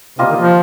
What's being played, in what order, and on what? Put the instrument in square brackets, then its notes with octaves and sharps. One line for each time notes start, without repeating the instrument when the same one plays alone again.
[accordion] C3 [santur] G3 A#3 F4 D#5
[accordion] D#3
F3